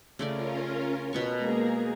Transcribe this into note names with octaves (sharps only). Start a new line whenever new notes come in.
C#3 A3 C#4 F4 A#4 D5
B2 B3 A#5 C#6
G#3 A#3 G#4